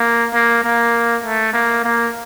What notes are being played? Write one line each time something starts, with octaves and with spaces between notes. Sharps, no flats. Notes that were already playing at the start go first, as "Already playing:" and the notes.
Already playing: A#3
A#3
A#3
A3
A#3
A#3